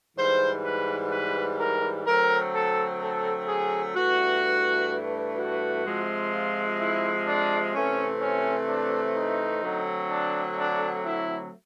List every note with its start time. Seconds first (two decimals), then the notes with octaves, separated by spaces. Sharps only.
0.17 G#2 E3 G3 C5
0.64 B4
1.11 B4
1.59 A#4
2.06 D3 F#3 A3 C4 A#4
2.54 A4
3.01 A4
3.48 G#4
3.95 G2 E3 A3 F#4
5.38 F#4
5.85 C3 F3 G#3 C4
6.32 F4
6.79 E4
7.27 D4
7.74 C3 E3 A3 C4 C#4
8.21 C#4
8.68 D4
9.16 D#4
9.63 D3 F#3 A3 C4
10.10 D4
10.58 D4
11.05 E4